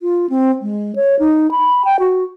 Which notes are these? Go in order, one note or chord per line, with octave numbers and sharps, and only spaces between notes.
F4
C4
G#3
C#5
D#4
B5
G5
F#4